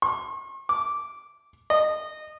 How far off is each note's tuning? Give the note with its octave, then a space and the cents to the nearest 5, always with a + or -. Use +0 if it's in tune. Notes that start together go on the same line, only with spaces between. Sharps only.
C#6 -45
D6 -10
D#5 -20